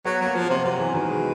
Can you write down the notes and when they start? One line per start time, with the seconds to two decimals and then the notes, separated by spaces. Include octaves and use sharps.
0.05 F#3 B3
0.21 F#3 A#3
0.35 F3
0.44 A#3
0.50 C3
0.65 C3 F#3
0.80 E3
0.94 B2 D#3
1.08 G#3